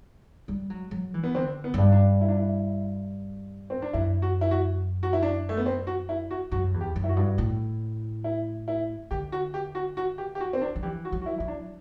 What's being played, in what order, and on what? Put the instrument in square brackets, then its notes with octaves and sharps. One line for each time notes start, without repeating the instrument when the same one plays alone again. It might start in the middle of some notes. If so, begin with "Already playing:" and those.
[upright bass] G3
F#3
F#3
E3
[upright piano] B3
[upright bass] D3 [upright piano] C4
[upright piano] B3
[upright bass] F#2
G2
[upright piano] D4
E4
D4
E4
C4
D4
[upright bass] F#2 [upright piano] E4
[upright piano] F#4
E4
F#4
F#4
E4
D4
A3
B3
C4
F#4
E4
F#4
[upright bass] F#2 [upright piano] F#4
[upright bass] E2
[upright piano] G4
[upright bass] F#2
[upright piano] E4
F#4
[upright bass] G2
A2
[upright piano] E4
E4
[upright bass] D3 [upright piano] G4
[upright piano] F#4
G4
F#4
F#4
G4
G4
F#4
C4
D4
[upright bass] F#3
[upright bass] E3 [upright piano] G4
[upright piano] F#4
[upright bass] F#3
[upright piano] F#4
E4
[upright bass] F#3 [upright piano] E4
[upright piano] D4